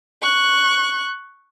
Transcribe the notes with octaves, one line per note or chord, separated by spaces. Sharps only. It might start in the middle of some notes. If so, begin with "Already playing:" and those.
C#6 F#6